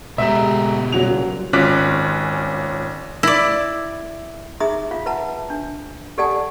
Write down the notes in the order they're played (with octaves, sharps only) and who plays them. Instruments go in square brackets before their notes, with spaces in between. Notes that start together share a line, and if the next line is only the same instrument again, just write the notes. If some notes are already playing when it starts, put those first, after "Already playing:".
[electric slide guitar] B2 B3 G4 [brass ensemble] G#3 A3 A#5 [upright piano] E5
[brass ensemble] C2 A#2 C#3 [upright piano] F#3 F7
[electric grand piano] G#1 C#4 F4 D6 F#6 B6
[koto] E4 D5
[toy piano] D#4 G#4 E5 A#5 D#6
F4 F5
B4 E5 F#5 A5 A#5
D4
G4 A4 D5 F#5 G#5 A5